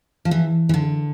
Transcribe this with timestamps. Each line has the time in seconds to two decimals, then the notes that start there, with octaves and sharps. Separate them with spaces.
0.25 F3
0.31 E3
0.69 E3
0.74 D3